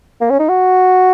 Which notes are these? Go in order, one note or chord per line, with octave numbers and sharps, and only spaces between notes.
A#3
C#4
D#4
F#4